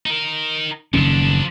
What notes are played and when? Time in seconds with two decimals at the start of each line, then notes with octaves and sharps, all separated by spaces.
0.06 D#4 A#4
0.94 F#1 D#3 F3 C#4 D4